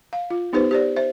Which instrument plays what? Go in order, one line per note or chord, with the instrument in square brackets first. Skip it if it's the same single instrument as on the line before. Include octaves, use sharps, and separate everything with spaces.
[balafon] F5
F4
B3 D#4 G4 B4 C5
G4 C5 D5
C5 E5